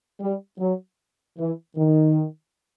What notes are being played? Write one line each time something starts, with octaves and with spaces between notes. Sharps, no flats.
G3
F#3
E3
D#3